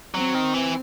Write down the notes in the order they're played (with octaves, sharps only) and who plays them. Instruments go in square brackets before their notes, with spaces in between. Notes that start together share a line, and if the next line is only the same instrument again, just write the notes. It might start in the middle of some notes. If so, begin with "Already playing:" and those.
[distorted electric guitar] F#3 [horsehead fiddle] C4
[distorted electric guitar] D#3
E3